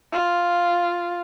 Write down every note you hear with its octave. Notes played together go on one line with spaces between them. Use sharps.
F4